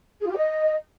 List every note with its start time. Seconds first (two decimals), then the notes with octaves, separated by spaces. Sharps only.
0.21 G#4
0.26 F4
0.31 G4
0.37 D#5